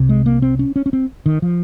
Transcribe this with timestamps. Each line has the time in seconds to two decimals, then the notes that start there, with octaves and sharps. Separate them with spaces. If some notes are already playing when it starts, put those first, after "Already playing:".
Already playing: C2 C3
0.09 G#3
0.26 A#3
0.42 C4
0.59 C#4
0.76 C#4
0.86 C#4
0.93 C4
1.26 D#3
1.42 F3